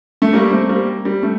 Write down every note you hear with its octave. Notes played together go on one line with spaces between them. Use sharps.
A3
G3 A#3
A3 C4
G3 A#3
G3
A3